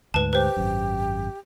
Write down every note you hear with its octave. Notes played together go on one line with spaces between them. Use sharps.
D2 G#2 B4 A5
G4 B4 C5
G#1 F#2